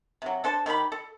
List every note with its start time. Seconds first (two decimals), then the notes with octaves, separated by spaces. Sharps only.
0.22 C3 F#3
0.44 D4 A4 C5 A5
0.66 D#3 G4 G#4 B5
0.92 A4